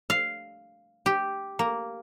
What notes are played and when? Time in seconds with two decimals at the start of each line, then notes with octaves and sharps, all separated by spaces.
0.10 F5
1.06 G4
1.59 A#3